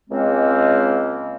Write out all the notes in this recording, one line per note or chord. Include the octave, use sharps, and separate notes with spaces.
C#2 G#3 A#3 C4 C#4